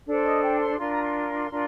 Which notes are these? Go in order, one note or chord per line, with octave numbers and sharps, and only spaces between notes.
D4 A4 C5
D#5
G5
C6
D4 F4 A#4 C6
A#5
C6
D4 F4 A#4